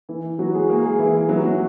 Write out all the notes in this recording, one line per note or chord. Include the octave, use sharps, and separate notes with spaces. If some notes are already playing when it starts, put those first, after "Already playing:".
E3 E4
F#3 F#4
G#3 G#4
A#3 A#4
G#3 G#4
E3 E4
F#3 F#4
F#3 F#4